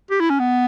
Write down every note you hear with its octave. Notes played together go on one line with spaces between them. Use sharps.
G4
E4
C#4
B3